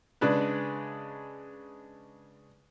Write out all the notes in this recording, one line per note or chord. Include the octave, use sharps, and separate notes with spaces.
C#3 G#3 D4 B4